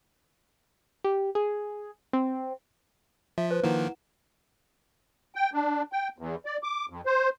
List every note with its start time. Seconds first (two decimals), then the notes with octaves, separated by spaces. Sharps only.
1.04 G4
1.35 G#4
2.13 C4
3.38 F3 E5
3.51 B4 C5
3.63 D#3 F3 A#3 E4 F#5 E7
5.35 G5
5.53 D4
5.92 G5
6.18 E2
6.46 D5
6.63 D6
6.89 F2
7.06 C5